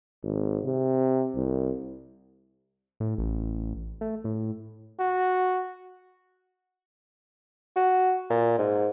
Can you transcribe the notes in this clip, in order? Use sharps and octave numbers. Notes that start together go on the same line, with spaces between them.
G#1
C3
C2
A2
A1
A3
A2
F#4
F#4
A#2
G#2